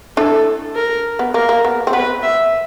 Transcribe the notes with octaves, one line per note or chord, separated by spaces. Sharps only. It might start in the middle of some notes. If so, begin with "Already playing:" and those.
D4 E4 A4
A#4
B3
A#3 A#4
A#3
B3
C4
B3 B4
E5